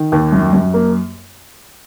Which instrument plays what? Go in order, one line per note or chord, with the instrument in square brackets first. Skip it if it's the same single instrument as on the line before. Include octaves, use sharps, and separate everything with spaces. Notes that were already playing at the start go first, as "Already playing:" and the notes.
Already playing: [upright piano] D#3
D#2
F#2
F#2
A#3